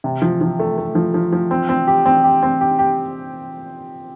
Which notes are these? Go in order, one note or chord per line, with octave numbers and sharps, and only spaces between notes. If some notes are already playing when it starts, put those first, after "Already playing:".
C3
F3
F3
A3
A3
F3
F3
F3
C4
C4
G4
C4
G4
C4
G4
G4